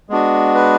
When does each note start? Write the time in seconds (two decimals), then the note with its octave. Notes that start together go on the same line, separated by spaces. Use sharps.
0.09 G#3 B3 D4 F#4
0.55 B4